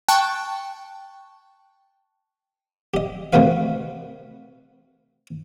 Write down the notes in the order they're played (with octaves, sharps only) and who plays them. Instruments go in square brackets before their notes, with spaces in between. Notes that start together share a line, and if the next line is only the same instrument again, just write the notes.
[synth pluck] G5 A5 C#6 F#6
[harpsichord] G4 D#5
C3 D#3 A3 F#4 B4 F5